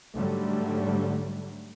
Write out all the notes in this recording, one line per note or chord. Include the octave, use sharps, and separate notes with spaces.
G#2 D3 F#3 G3 A3